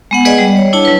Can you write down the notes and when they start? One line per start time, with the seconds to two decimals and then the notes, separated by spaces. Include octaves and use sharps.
0.11 G#3 B3 F#5
0.25 G#4 B4 D5 D#5 F#5 G#5
0.38 G3
0.57 C#5
0.73 D4 E4 C#5 A5
0.85 F#3 B4